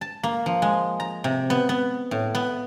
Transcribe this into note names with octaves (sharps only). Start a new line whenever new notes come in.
A5
A#3
F3
G#3
A#5
C3
B3
B3
A2
B3